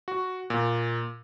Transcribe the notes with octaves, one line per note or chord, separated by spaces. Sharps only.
F#4
A#2